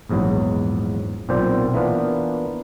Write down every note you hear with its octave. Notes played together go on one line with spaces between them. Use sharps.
A#1 E2 G#2 F#3
B1 A#2 C4 C5 D5
E3 A#3 B3 D4 F4